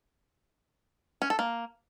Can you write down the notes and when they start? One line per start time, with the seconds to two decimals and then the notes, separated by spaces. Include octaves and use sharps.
1.22 C#4
1.30 A4
1.39 A#3